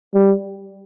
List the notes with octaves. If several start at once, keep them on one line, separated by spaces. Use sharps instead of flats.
G3